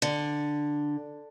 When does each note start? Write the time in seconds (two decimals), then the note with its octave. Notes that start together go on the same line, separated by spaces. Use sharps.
0.02 D3